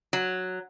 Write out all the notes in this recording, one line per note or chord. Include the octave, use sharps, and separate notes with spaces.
F#3